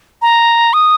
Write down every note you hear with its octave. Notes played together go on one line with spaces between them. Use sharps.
A#5
D#6